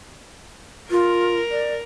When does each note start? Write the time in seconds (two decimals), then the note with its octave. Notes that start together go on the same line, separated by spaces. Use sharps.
0.91 F4 A#4
1.51 D5